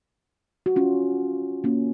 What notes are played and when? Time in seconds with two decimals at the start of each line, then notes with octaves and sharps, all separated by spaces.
0.66 F#4
0.76 C#4 F4
1.64 A#3 C#4